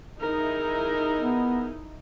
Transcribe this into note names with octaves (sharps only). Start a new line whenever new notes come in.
D#4 E4 G#4 A#4
B3